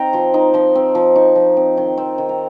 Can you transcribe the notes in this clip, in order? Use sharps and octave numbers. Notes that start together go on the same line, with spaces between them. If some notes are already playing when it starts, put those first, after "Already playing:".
Already playing: C4 D#4 G5 A#5
F3 C6
D#4 C6
F3 C6
C4
F3
D#4 C#6
F3
C4
D#3 C6
C4
D#3
A#5